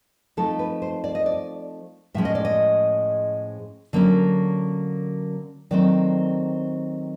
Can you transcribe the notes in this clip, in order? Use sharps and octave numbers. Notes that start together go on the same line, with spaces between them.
F3 A3 C4 D#4 A4
B4
C5
D5
D#5
D5
A2 F3 G#3 C#4 E5
D#5
D5
D#5
D3 F#3 A#3 C#4
D#3 F#3 A3 C4 D5